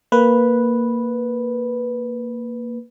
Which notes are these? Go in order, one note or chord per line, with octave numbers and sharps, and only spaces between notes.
A#3 B4